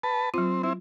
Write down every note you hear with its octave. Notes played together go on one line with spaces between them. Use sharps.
B4 A5
F#3 C4 F4
C4 E4